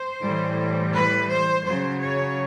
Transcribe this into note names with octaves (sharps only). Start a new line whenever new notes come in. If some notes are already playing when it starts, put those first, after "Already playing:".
Already playing: C5
A2 E3 G3
B4
C5
C#3 F#3 C5
C#5